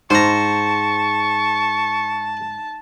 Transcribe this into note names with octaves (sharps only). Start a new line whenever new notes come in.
G#2 C5 A5 A#5 C#6